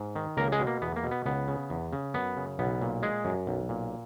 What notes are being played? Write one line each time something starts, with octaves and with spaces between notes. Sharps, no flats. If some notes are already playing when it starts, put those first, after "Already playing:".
Already playing: G#2
D#3
C#2 A#3 A#4
G#3 G#4
B2
A#3
E2 B3
A#3
B2
B3
C#2 B3
C#3
E2
C#3
F#2 B3
C#3
B1 B3
A#2
G#3 G#4
F#2
B1
A#2